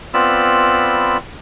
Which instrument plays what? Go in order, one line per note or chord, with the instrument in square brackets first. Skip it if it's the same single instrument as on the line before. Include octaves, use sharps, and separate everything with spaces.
[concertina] B3 C4 F4 D5 B5 E6